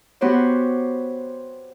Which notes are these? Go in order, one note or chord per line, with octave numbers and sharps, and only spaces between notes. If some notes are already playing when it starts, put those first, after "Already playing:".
B3 F#4 G4 C5 C#5